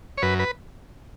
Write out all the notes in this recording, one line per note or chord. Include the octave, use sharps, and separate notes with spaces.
C#5
F#2 B4
B4